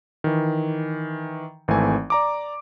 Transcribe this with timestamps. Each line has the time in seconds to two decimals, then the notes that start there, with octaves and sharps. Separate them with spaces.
0.24 D#3 E3
1.68 G#1 E3 A3 C4 G#5
2.10 D5 A#5 D6